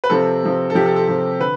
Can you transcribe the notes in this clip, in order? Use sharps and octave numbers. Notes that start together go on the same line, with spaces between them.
B4
C3 F3 C4 A4
C3 F3 C4
A4
C3 F3 C4 G4
A4
A4
C3 F3 C4
D3 B4